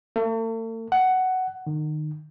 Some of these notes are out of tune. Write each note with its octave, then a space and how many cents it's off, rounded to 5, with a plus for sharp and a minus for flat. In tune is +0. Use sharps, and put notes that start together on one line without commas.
A3 +45
F#5 +10
D#3 -30